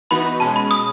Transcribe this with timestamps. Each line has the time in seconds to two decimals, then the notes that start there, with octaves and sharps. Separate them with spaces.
0.11 E3 B3 D#4 F#4 B4 B5
0.40 B2 G#3 C#4 A5
0.56 B5
0.71 D#6